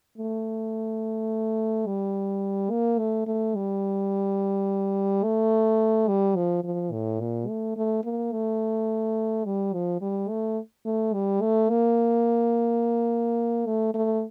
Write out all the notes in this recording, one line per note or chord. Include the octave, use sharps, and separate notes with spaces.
A3
G3
A#3
A3
A3
G3
A3
G3
F3
F3
A2
A#2
A3
A3
A#3
A3
G3
F3
G3
A3
A3
G3
A3
A#3
A3
A3